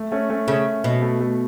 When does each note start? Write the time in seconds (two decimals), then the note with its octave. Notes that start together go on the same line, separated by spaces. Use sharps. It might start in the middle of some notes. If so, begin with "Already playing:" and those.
Already playing: A3
0.12 A3 C#4
0.30 A3 C#4
0.48 C#3 A3 C#4
0.84 B2
1.02 A3
1.20 A3